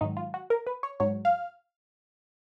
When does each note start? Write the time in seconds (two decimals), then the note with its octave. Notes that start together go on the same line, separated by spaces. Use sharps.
0.01 G#2 D#3 F#3 D#4
0.17 F4
0.34 F#4
0.50 A#4
0.67 B4
0.83 C#5
1.00 G#2 F#3 C#5
1.25 F5